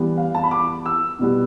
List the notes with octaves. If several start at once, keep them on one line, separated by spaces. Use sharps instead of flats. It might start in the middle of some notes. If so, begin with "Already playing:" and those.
Already playing: E3 G3 B3
F5
A5
B5
D6
E6
B2 G3 B3